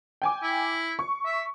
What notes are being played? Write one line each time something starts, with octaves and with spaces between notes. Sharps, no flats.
G5 G#5 D6
E4
C#6
E5